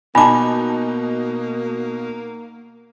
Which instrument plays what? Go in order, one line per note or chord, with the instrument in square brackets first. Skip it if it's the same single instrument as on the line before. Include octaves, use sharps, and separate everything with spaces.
[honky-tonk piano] B2 D#4 [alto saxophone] A#3 [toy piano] F4 D6 [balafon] G#5 A5